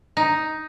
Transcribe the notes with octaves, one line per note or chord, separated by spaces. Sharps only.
D#4